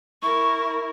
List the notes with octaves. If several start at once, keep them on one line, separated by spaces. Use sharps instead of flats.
E4 A#4 C#6